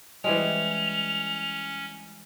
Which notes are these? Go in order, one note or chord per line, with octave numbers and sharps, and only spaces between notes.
E3 G3 G#3 C#4 F7